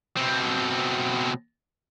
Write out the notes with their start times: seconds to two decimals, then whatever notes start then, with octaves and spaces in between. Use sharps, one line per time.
0.17 B2 C4